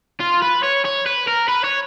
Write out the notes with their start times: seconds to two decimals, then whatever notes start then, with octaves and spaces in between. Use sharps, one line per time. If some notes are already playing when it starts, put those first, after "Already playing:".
0.20 F4
0.42 B4
0.63 C#5
0.85 C#5
1.06 B4
1.27 A#4
1.48 B4
1.64 C#5